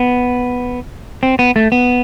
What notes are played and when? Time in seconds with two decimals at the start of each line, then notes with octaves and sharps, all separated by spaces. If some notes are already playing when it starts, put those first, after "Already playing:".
Already playing: B3
1.23 C4
1.39 B3
1.56 A3
1.72 B3